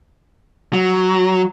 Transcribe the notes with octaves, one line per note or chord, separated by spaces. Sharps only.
F#3